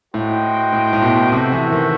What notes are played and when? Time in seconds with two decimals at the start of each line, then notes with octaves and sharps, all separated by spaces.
0.14 A2 F#4 C5 D#5 G5
0.73 A2
0.93 A2
1.02 B2
1.32 C3 F#4 A4 C5 E5
1.52 E3
1.72 D#3